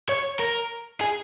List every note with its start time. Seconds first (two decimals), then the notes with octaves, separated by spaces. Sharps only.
0.09 C#5
0.40 A#4
1.01 G#4